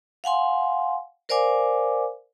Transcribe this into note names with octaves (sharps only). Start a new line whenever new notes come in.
F5 F#5 G#5 C6
A#4 C5 D5 F5 G#5 D6